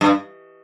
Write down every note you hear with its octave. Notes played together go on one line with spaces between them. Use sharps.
G2